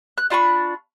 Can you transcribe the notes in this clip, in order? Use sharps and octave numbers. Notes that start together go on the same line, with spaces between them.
F#6
D4 F4 B5 C#6